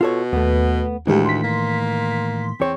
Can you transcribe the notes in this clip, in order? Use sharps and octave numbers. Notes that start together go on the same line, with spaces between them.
B2 F4 A4 C#5
D#2 A3 B3
D2 A2 D#3 E3 G#3 G4
C6 B6
A#3
E2 C4 C#5